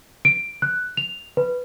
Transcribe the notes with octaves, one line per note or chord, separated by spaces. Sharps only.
D7
F#6
F7
B4